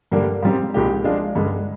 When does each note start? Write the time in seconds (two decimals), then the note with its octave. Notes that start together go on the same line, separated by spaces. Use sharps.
0.12 G2 D3 G3 A#3 D4
0.43 G#2 G3 C4
0.74 C2 A#2 G#3 D#4 G4
1.04 F3 G#3 D4 F4
1.35 G2 D3 G#3